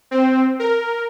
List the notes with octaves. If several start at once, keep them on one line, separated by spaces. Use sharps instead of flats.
C4
A#4